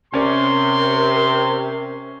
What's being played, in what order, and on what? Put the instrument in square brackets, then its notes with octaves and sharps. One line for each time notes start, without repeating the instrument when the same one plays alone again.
[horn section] C3 [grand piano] C#4 C#5 D5 [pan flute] A#4 [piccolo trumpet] C6